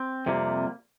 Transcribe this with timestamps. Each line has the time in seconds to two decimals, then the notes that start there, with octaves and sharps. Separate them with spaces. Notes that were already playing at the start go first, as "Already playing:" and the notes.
Already playing: C4
0.26 F2 C3 G3 A#3